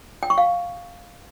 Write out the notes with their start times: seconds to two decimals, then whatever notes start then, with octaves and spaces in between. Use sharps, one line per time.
0.23 G5
0.30 C#6
0.38 F5